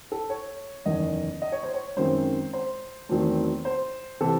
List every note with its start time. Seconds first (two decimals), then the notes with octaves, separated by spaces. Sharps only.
0.12 A4
0.30 C#5
0.85 F#1 E2 D#3 D#5
1.42 D#5
1.52 C#5
1.63 C5
1.74 C#5
1.97 F#2 D#3 G#3 C4 C5
2.53 C5
3.09 E2 D#3 F#3 A3 C4
3.65 C5
4.21 C3 E3 C4 A4